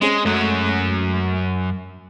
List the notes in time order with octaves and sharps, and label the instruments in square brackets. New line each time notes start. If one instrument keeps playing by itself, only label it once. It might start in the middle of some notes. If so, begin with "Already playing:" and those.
[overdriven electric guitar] G#3 [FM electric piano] C4 C#4 G#4
[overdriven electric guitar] F#2 F#3 [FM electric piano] G#3 A3